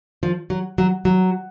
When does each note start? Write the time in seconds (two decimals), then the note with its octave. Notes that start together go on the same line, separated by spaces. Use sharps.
0.23 F3
0.50 F#3
0.78 F#3
1.05 F#3